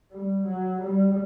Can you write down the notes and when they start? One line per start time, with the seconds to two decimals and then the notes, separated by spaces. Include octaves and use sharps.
0.11 G3
0.46 F#3
0.82 G3